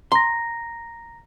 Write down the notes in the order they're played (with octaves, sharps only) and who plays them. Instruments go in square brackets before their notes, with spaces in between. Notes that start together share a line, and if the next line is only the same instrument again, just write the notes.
[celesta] A#5 A#6 [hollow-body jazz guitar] C6